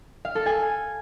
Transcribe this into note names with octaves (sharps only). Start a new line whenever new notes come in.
F5
A4
G#5